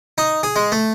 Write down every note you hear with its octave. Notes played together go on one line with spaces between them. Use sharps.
D#4
G#4
G#3
A3